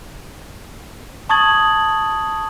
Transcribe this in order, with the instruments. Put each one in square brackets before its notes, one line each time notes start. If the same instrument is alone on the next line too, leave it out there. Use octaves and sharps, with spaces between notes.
[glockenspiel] A5 C#6 D#6 G#6 A6 F#7